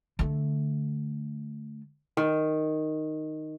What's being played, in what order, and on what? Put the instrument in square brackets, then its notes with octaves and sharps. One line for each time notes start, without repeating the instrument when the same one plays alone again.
[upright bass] D3 A3
[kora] D#3